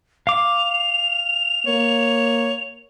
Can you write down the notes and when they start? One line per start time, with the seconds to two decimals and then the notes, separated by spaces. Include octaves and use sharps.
0.27 F5 D6 F7
1.67 A#3 C#5